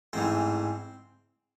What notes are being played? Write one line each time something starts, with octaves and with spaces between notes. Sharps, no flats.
A1 G#2 E3 C4